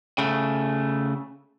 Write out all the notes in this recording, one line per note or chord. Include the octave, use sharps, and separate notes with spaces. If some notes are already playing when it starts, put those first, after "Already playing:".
C#3 A3